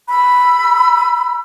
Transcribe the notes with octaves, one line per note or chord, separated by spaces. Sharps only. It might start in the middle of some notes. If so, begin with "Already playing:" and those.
B5 E6